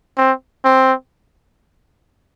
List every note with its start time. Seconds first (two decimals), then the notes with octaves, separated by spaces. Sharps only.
0.18 C4
0.65 C4